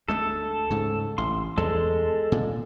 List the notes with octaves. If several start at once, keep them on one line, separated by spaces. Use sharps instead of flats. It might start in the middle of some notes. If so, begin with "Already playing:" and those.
D2 G#3 A3 A4
G#2 C#3
A1 C6
E2 G#3 A4
A#2